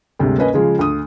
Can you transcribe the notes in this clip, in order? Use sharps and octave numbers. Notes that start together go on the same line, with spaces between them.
D2 G2 C3 G#3
A#3 C#4 B4 D#5 G#5
C#3 F3 G#3 F4 G#4
D2 D#6